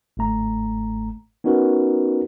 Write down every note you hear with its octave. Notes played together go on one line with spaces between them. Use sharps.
G1 G#2 A3 A#5
B3 C#4 D#4 F#4 A#4 B4